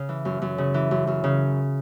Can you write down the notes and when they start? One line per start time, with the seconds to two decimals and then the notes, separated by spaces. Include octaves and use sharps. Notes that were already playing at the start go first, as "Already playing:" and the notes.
Already playing: C#3
0.09 E3
0.25 F#2
0.42 F#2
0.58 C#3
0.74 E3
0.91 F#2
1.07 F#2
1.24 C#3